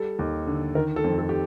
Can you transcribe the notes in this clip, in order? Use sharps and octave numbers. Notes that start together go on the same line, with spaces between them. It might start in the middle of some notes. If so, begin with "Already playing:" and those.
Already playing: G3 A4
D#2
D3
D#3 A#4
A4
F2
A4
G4